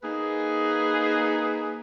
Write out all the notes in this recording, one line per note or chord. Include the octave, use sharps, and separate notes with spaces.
A#3 D#4 G#4 B4